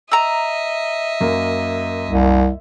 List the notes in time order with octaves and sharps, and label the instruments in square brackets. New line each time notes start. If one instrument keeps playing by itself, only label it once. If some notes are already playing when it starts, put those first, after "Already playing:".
[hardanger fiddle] D#5 E5 [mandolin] A#5 E6
[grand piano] F#2 A#3 A#4
[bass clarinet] C2